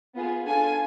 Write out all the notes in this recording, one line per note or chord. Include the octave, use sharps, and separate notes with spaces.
B3 F4 G#4
D4 F4 A4 G#5